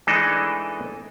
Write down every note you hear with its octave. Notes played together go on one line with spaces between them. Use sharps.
E3 G#3 A3 D4 D#4 A4